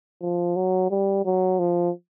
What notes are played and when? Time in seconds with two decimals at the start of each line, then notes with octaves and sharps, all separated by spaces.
0.22 F3
0.56 F#3
0.90 G3
1.25 F#3
1.59 F3